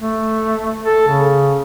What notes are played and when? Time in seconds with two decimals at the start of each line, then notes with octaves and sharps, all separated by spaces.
0.01 A3
0.84 A4
1.08 C#3